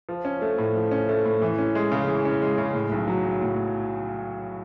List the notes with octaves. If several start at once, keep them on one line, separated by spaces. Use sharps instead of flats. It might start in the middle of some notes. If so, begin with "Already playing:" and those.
F3
C#4
A3
A2
F3
C#4
A3
A2
E3
C#4
G#3
C#3
E3
C#4
G#3
C#3
A2
B1
F#3
B1
A2